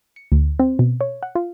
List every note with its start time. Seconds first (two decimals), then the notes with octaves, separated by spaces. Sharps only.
0.16 C#7
0.32 D2
0.60 C4
0.79 B2
1.01 C#5
1.23 F#5
1.35 F4